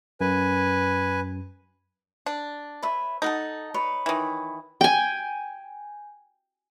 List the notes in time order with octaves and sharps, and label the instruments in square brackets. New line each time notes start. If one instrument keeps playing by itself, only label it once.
[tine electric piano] F#2 [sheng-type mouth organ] B4 G#5
[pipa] D4
[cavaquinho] B4 C#5 E5
[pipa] D#4 [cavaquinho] A4 F#5 A5
[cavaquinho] B4 C#5
[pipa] D#3 E3
[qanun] G5 G#5